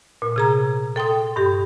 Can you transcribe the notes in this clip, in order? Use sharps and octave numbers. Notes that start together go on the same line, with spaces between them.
A#2
C3 G#4 A#5
A4 G5 C6 D#6
G2 G4